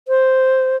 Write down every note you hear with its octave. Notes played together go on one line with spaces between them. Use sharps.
C5